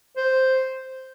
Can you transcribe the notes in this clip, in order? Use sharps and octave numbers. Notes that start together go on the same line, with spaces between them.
C5